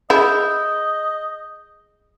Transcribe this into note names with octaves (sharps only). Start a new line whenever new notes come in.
E4 G#4 D#5 G6